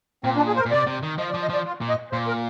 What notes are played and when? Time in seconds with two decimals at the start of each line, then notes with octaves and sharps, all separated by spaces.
0.24 A#2 C4
0.37 D4
0.47 G#4
0.56 C5
0.59 A#4
0.66 A#2
0.71 C3 D5
0.87 C3
1.03 D#3
1.18 F3 D#5
1.30 D5
1.34 F3
1.42 D#5
1.50 F3 D5
1.66 F4
1.81 A#2
1.89 D#5
2.12 A#2 C5
2.28 A#4